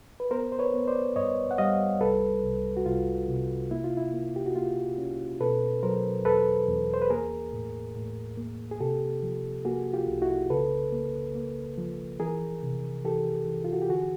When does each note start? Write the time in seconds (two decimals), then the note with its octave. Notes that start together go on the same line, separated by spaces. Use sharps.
0.20 B4
0.31 B3 A#4 C5
0.52 C5
0.59 B4 C#5
0.74 B3
0.88 C5 D5
1.16 G2 C#5 D#5
1.51 F#5
1.58 G3 D#5 F5
2.00 C2 A4 B4
2.43 C2
2.77 F#4
2.86 C2 F4
3.28 C3
3.71 A#3 E4
3.84 F4
3.97 E4
4.13 A#3
4.36 G4
4.46 F#4
4.56 A#3 F4
4.98 C#4
5.40 B2 A4 B4
5.83 F#3 A#4 C5
6.25 E2 A4 B4
6.68 E2
6.94 C5
7.02 B4
7.10 A#3 G#4 A#4
7.53 A2
7.96 A2
8.38 A#3
8.71 G#4
8.80 C3 G4 A4
9.23 F3
9.65 A#3 F#4 G#4
9.94 F4 G4
10.08 C2
10.21 E4 F#4
10.50 C#3 A4 B4
10.92 A#3
11.35 A#3
11.78 F3
12.20 E3 G#4 A#4
12.63 C3
13.05 E3 G4 A4
13.47 E3
13.64 F4
13.73 F#4
13.82 G4
13.90 D3 F#4 G#4